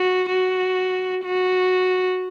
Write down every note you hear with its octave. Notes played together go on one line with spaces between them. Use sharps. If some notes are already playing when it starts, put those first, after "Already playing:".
Already playing: F#4
F#4
F#4